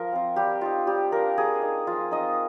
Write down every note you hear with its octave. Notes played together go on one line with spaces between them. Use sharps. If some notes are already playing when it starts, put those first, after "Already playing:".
Already playing: F3 A#4
C4 F4
G3 G4
C4 D#4 F4
G3 G4
A#3 D4 A#4
A#3 G#4
D#4
F3 F4
C4 D#4 D#5